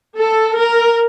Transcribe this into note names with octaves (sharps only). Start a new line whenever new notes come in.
A4
A#4